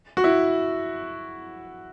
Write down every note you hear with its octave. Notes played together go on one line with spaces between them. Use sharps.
F#4
E4